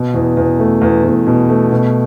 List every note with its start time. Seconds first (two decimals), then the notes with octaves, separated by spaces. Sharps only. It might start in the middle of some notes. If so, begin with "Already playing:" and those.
Already playing: B2
0.14 E2
0.37 E2
0.59 A3
0.81 E2
1.04 E2
1.26 B2
1.49 A3
1.71 B2